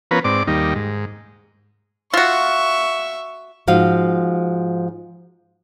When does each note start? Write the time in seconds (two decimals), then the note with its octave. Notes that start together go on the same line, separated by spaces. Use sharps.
0.11 F3 B3 C#4 A#4 B4
0.24 G#2 C4 D5 D6
0.47 D#2 G3 A#3 D#4
0.75 G#2
2.14 F4 F#4 E5 C#6
3.67 G#2 F3 F#4 F5